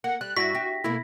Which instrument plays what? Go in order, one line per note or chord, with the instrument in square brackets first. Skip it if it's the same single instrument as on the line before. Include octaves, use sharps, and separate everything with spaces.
[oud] A#3 [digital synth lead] F#5
[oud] G3 [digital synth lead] F#6
[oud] G2 E4 D5 [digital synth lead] F#4 [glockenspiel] A#6 B6
[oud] G4
[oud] B2 A3 A#3 [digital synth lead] E4